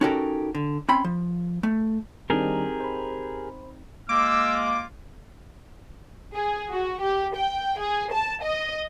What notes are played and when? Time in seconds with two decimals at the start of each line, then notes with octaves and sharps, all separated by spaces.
0.01 C#4 D#4 F#4 G4 A4 A#4
0.55 D3
0.89 C4 C#4 B5 C6
1.04 F3
1.63 A3
2.30 D#3 G3 C4 D4 D#4 G4 G#4 A#4
2.80 C5 B5
4.09 G#3 A#3 F4 D6 E6
6.36 G#4
6.71 F#4
7.01 G4
7.35 G5
7.79 G#4
8.13 A5
8.43 D#5